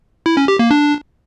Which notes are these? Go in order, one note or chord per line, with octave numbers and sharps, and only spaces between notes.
E4
C#4
G4
A#3
D4